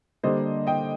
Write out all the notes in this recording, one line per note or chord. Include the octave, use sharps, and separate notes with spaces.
D3 G3 A#3 D4 C5 D#5
D#5 G5